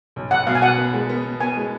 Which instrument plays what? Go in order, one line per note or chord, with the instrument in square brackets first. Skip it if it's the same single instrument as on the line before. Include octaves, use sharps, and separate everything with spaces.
[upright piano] B1
[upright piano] B1 [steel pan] F#5
[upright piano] B2 [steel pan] F5
[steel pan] G#5
[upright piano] B2 [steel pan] F#5
[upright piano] B3
G#3
B3
B3
[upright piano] B3 [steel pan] G#5
[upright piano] G#3